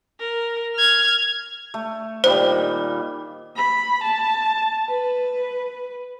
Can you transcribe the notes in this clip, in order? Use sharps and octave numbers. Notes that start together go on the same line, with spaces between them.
A#4
F6 G#6
A3
A#2 D#3 G3 C5
B5
A5
B4